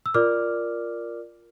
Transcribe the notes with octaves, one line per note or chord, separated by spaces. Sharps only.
E6
F4 A#4 D5 D6 F6